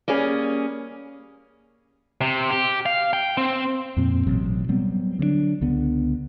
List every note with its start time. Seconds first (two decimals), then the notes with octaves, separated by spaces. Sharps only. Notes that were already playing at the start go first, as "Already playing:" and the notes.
0.08 G3 A#3 C#4 G#4
2.21 C3
2.51 G4
2.86 F5
3.13 G5
3.37 C4
3.97 F2 A#2 C4
4.27 A1 B2 F#3
4.69 F#3 G3 B3 C4
5.19 D3 F#3 A3 D4
5.61 C#2 D3 B3